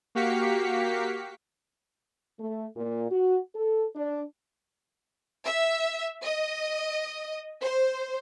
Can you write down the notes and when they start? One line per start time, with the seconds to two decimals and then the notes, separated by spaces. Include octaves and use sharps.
0.15 A#3 F#4 G4 F5 B6 C#7
2.40 A3
2.76 A#2
3.11 F#4
3.56 A4
3.96 D4
5.44 E5
6.23 D#5
7.60 C5